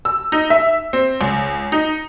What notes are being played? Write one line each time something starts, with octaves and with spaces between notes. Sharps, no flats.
E6
D#4
E5
C4
C#2
D#4